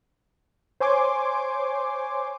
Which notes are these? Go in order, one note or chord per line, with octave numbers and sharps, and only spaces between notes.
C5 C#5 G#5 C6 D6